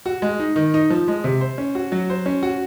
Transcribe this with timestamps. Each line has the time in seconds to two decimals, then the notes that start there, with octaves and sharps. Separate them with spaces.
0.06 F#4
0.22 G#3
0.39 D#4
0.56 D#3
0.74 D#4
0.90 F3
1.08 G#3
1.24 C3
1.41 C5
1.58 C#4
1.75 F#4
1.92 F#3
2.10 C5
2.26 C#4
2.43 F#4